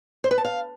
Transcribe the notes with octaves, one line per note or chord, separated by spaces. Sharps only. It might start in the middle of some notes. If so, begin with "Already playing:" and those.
C5
B4
A5
F5